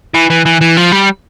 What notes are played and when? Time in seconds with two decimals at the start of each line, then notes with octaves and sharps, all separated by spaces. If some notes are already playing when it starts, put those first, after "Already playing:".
0.15 E3
0.30 E3
0.46 E3
0.61 E3
0.77 F3
0.92 G3